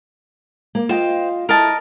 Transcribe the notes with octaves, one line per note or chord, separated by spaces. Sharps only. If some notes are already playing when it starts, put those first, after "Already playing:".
A#3
F4 C5 D#5 F5 G5
E4 A4 A#4 D#5 A5